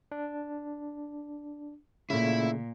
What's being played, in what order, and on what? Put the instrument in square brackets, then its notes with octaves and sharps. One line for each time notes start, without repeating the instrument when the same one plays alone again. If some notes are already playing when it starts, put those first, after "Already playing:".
[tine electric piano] D4
[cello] A#2 [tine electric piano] C#3 A3 [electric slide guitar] E4